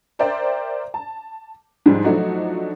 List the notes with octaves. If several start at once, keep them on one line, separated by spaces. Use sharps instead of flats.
A#4 C5 D5 E5 G5
A5
G#2 F3 G3 G#3 D4
F3 F#3 A3 D4 D#4 F#4